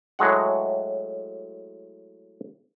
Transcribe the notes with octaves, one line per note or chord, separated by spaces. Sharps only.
A2 F#3 G#3 F#5